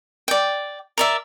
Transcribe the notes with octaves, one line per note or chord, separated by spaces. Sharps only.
D5 G5
A#4 D5 E5